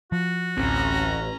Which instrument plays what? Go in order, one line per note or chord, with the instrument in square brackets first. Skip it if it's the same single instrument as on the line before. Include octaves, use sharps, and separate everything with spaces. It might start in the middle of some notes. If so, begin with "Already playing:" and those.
[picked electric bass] F3 [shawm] F#4
[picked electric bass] D1 C4 [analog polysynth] A1 [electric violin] C#4 A#5